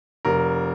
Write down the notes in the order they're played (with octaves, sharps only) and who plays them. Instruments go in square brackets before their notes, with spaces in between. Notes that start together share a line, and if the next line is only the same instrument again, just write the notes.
[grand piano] F1 A#4